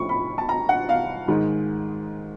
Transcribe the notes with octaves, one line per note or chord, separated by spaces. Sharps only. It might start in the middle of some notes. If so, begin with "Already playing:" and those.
Already playing: A2 F3 A3 C#4 C#6
B5
A5
A#5
F#5
F5
G#2 D#3 G#3